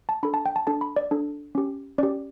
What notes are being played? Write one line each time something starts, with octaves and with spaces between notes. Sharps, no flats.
A5
D4 A4 B5
A5
G5
A5
D4 A4 A5
B5
D5
D4 A4
C#4 G4
C#4 G4 D5